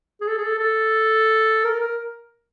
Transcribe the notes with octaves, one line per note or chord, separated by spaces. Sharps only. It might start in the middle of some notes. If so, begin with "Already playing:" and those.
G#4
A4
G#4
A4
A4
A#4
A#4